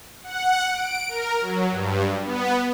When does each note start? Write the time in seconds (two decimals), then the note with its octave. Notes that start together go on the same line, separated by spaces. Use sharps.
0.24 F#5
0.72 D7
1.08 A#4
1.41 F#3
1.71 G2
2.24 B3